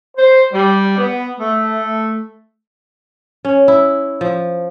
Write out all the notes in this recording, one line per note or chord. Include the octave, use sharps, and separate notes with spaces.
C5
G3
B3
A3
C#4
E4
F3